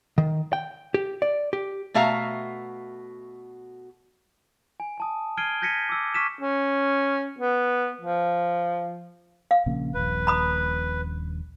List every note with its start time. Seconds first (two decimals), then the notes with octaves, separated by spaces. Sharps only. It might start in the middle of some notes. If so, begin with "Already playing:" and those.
0.18 D#3
0.53 G5
0.94 G4
1.22 D5
1.53 G4
1.94 B2 A3 F#4 E5 F5 A#5
4.80 G#5
4.98 G#5 A5 D#6
5.37 F6 G#6 C7 D7 D#7 G7
5.62 G6 G#6 A#6 B6 C#7 D#7
5.89 D6 E6
6.14 C#6 D6 F6 B6 D#7 E7
6.40 C#4
7.39 B3
8.01 F3
9.51 F5
9.66 A#1 C#3 A#3
9.94 D#1 A#1 B4
10.27 A#5 B5 D#6